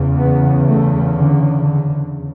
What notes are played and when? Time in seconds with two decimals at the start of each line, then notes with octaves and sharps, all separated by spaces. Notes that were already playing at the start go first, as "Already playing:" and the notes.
Already playing: E2 C#3
0.20 B3
0.67 A3
1.14 D3
1.61 D3